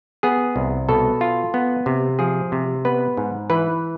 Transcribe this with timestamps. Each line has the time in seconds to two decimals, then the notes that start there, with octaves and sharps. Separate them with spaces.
0.23 B3 G#4
0.56 C2
0.88 B2 A4
1.21 F4
1.54 B3
1.86 C3
2.19 F3 G#4
2.52 C3
2.85 B3 B4
3.17 G#2
3.50 E3 B4